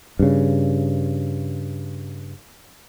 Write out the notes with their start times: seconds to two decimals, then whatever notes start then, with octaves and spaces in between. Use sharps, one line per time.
0.19 G2 C#3